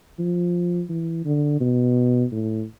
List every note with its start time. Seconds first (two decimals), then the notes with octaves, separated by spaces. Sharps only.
0.19 F3
0.89 E3
1.25 D3
1.60 B2
2.32 A2